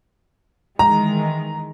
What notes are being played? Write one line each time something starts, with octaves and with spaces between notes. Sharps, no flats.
D#3 E3 G#3 A#5